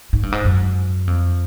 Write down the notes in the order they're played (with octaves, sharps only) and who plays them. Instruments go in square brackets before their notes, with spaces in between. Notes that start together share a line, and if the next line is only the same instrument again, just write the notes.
[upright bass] G#2
G2
G#2
F#2
F2